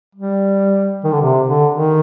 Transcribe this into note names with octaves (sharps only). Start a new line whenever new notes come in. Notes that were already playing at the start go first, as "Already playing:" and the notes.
G3
D#3
D3
C3
D3
D#3